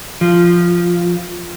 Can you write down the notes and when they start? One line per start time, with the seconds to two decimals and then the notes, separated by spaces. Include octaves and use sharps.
0.21 F3